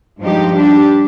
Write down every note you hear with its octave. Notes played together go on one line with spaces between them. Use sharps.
G2 F3 G#3 D#4 G4
G3 D4 G4